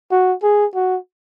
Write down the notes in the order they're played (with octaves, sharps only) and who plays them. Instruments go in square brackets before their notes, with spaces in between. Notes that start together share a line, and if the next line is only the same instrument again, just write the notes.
[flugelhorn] F#4
G#4
F#4